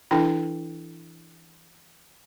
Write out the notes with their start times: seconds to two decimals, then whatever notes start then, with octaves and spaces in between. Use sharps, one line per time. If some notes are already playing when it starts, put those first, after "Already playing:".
0.11 E3 D4 E4 A4 G5